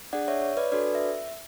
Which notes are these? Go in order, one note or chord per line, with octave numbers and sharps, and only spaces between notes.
D4 G#4 D5 F#5
C#5 E5
C#5
B4 D5
D4 F#4 A4 B4 D5
E5